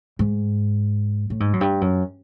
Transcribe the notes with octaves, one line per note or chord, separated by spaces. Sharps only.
G#2
A2
G#2
F#2
G2
F#2